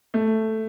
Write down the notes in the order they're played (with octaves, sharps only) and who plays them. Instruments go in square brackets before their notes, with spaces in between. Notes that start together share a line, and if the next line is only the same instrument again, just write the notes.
[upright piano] A3